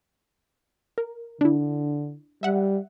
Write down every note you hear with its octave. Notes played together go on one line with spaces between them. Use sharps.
A#4
D3 D4 E4
G3 E5 F#5